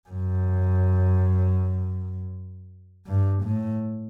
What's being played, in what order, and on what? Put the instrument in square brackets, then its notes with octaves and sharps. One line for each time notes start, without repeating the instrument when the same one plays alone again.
[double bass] F#2
G2
A2